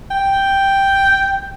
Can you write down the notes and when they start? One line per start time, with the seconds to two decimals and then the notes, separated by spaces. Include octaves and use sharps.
0.11 G5